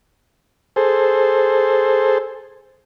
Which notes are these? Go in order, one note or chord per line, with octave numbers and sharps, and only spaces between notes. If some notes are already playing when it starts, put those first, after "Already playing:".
G#4 A4 C5